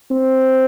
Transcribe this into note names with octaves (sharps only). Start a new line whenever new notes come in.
C4